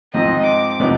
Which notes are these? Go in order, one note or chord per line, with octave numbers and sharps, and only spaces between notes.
G#2 F3 C4 D#5
D6
C3 F3 G#3 B3 D#4